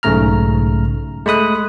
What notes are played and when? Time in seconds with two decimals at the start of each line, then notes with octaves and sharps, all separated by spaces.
0.03 B1 G#2 C#3 A3 A#5 F6
1.26 G#3 A3 B5 D#6 F#6